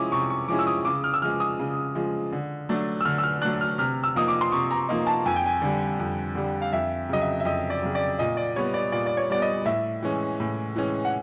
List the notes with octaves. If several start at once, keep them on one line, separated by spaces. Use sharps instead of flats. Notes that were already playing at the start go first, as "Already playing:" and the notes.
Already playing: C3 F3 G#3 C#4 E4 D6 D#6
C3 C#6
C#6
F3 G#3 C#4 E4 D6
E6
D#6
C#3 D6
F6
E6
F3 G#3 F6
D#6
C#3
F3 G#3
D3
F#3 A3 D4
E6
D3 F6
E6
F6
F#3 A3 D4 F#6
F6
C3 F6
E6
F3 A#3 D#4 D#6
D6
C6
C3 C#6
A#5
F3 A#3 D#4
A5
F2 G#5
G5
G#5
D3 G3
F2
D3 G3
F5
F2 E5
C#3 F#3 D#5
E5
E5
F2 D#5
D5
C#3 F#3
D5
A#2 D#5
D5
G3 B3 C#5
D5
A#2 D5
D5
C#5
G3 B3 D5
D#5
A2 E5
E3 G#3 C#4
A2
E3 G#3 C#4
F#5